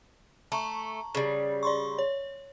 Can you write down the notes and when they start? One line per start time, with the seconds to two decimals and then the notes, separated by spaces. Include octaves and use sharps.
0.52 A3 A5 A#5 C#6
1.15 C#3 G3
1.63 D5 C6 C#6
1.99 C#5